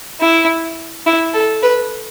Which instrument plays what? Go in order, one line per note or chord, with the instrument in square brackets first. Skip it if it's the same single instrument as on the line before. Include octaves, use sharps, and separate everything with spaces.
[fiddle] E4
E4
A4
B4